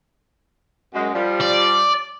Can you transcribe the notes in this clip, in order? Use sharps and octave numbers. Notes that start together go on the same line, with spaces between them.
F#2 G#3
F3 G3
D5